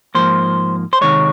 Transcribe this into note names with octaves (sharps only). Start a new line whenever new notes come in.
G#2 F3 A#3 C5
C5
C3 D#3 G#3 C#5